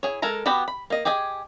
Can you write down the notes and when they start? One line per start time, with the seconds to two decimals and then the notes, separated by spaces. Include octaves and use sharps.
0.03 E4 G#4 C#5
0.22 G#3 A4 A#4 G#5 A#5
0.46 B3 F#4 G4 B5
0.68 B5
0.90 A#3 D#5
1.05 G4 G#4 D#5 G#5